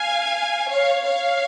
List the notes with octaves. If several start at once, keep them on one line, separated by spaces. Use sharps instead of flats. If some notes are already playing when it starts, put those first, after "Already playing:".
Already playing: F5 G#5
C#5 F5
C#5 F5